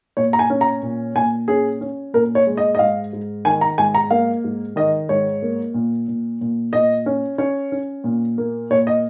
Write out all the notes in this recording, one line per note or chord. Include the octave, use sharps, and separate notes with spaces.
A#2 C#5
A#5
G#5
C#4
A#5
A#2
A#2 G#5
C#4 G#4
C#4
A#2 A#4
C#5
G#3
D#5
D#5
G#2 F5
G#2
D#3 G#5
A#5
G#2 G#5
A#5
A#3 F5
G#2
D#3 D#5
G#2 C#5
A#3
A#2
A#2
A#2
A#2 D#5
C#4
C#4 C#5
C#4
A#2
A#3
A#2 C#5
D#5